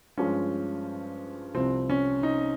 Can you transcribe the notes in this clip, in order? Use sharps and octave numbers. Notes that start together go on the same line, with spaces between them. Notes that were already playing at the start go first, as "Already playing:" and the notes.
G2 F3 G#3 C#4
C2 C3 F3 C4
C#4
D#4